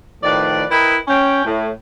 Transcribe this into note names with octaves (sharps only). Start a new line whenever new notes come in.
A2 D#3 F3 B4 D5
E4 A#4 B4 D#5 G5 B5
C#4 G5
A2